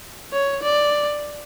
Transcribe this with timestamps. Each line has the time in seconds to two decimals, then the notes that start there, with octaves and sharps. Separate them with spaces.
0.33 C#5
0.63 D5